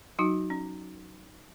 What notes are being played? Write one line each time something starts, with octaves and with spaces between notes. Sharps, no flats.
F#3 D#4 F#4
C#4